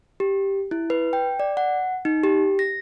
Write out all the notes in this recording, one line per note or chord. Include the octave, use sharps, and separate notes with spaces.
G4
E4
B4
G5
D5
F#5
D#4
G4
A#6